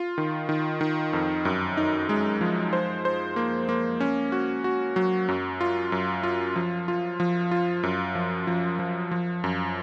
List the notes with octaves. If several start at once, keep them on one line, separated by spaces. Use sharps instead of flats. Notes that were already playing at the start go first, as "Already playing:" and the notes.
Already playing: F4
D#3
D#3
D#3
F2
F#2
D#4
G#3
F3
C5
C5
A#3
A#3
C#4
F#4
F#4
F#3
F#2
F4
F#2
F4
F3
F4
F3
F4
F#2
F3
F3
F3
F3
F#2